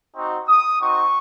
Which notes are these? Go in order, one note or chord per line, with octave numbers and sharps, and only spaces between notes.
C4 D#4 F#4
D#6
C4 D#4 F#4 C#6